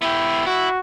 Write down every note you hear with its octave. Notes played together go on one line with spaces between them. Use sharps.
B3 E4 G4
E4 F#4